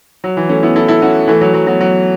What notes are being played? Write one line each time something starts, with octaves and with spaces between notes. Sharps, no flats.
F#3
E3
A3 C#4
B3 E4
E4 A4
E4 A4
C#4 F#4
E3 A3
F#3
F#3
F#3 B3
F#3